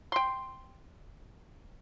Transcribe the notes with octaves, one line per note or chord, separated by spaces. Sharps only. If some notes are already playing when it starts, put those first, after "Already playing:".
G5 C6